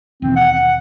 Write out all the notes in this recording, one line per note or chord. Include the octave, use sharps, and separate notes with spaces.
D#2 B2 E3 C4
F#5
F#5